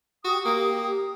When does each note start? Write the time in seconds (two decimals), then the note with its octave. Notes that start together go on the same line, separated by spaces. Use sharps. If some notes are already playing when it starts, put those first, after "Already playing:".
0.24 F#4 G4 D#6
0.45 A#3